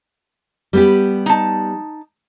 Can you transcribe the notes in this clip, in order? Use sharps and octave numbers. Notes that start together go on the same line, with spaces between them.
G3 B3 G4
D#4 A5